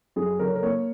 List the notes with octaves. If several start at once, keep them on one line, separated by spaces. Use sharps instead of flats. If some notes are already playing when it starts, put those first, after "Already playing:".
F#2 G#4
F#1 A#4
C#5
A#4
A#3 C#5